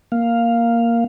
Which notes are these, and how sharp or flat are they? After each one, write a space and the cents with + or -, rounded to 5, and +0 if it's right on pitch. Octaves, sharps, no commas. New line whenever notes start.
A#3 +0 F5 +0